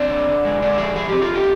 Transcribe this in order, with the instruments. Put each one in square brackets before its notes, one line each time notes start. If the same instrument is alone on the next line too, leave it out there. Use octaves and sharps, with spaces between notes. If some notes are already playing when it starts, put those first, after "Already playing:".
Already playing: [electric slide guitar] C4 D4
D3
D3
G#3
D3 D4
F3 G#4
D3 G#4
C4 G4
F4
D3
G4